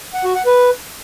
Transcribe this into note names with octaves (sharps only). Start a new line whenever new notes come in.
F#5
F#4
F#5
B4